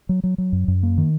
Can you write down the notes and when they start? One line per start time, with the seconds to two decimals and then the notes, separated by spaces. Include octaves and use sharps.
0.09 F#3
0.23 F#3
0.38 F#3
0.52 F#2
0.68 F#2
0.83 A#3
0.98 D#3